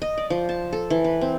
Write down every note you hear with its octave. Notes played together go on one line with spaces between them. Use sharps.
D#5
D5
F3
A5
A4
E3
B4
C4